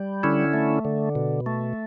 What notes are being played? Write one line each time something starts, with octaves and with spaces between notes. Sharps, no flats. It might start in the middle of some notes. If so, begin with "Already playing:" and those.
Already playing: G3
D3 C#4 E4
A3
D3
B2
A3